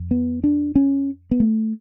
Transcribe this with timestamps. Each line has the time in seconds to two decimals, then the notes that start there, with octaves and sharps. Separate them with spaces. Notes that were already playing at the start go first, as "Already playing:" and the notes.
Already playing: F2
0.11 B3
0.44 D4
0.75 C#4
1.31 B3
1.40 A3